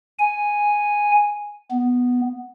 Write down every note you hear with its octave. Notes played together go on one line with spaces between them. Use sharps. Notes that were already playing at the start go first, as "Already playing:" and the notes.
G#5
B3